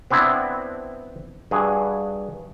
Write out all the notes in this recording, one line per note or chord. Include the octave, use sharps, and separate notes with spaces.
B3 C4 D4 E4
G2 F#4 G#4